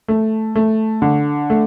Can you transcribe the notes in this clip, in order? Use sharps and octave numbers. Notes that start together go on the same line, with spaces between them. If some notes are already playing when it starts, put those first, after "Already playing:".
A3
A3
D3
A3